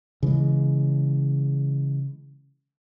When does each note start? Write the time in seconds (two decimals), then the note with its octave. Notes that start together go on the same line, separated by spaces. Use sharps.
0.23 C#3 E3 G#3